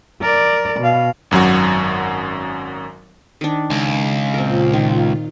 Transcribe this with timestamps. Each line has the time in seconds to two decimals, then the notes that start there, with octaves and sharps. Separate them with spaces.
0.21 A#4 D5
0.80 B2 F5
1.31 G#1 F#2 F#3 F#4
3.41 D#3 D4
3.70 C#2
4.34 A#2 C4 F4 A#4
4.73 D#3